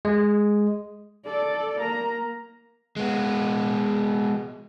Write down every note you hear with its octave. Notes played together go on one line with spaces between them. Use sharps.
G#3
A4 D5
A#3 A#5
G#3 B3